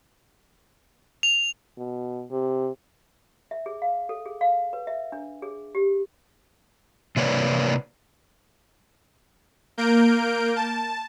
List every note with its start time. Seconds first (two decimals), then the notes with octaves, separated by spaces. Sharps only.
1.23 F7
1.78 B2
2.31 C3
3.51 E5
3.66 G#4
3.82 F5
4.09 A4
4.26 G#4
4.41 F5
4.73 B4
4.87 E5
5.12 D4
5.42 G#4
5.75 G4
7.16 C3 A#3 B4 C#5 D5
9.78 A#3 A#4 G6 D7
10.56 A5